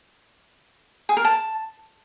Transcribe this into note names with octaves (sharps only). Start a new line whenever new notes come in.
G#4
A#4
A5